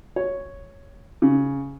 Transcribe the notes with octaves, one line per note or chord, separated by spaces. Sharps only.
C#5
C#3